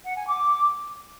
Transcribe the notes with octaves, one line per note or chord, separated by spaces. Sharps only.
F#5
G#5
D6